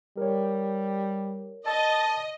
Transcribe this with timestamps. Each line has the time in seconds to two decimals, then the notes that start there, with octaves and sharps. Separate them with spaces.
0.17 G3 A#4 C#5
1.66 D#5 A5